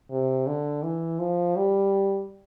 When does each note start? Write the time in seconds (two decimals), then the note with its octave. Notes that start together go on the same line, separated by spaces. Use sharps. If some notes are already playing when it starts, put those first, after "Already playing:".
0.10 C3
0.47 D3
0.83 E3
1.19 F3
1.56 G3